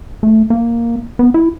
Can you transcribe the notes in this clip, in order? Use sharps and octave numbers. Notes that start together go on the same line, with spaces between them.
A3
A#3
B3
E4